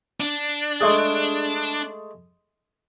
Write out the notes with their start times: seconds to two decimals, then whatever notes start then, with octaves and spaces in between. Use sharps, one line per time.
0.20 D4
0.81 G#3 A3 G#4